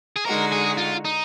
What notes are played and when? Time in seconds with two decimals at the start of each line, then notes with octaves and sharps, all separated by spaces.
0.16 G#4
0.25 D3 G#3 D#4 F#4 A#4
0.52 G#4
0.78 F4
1.05 D#4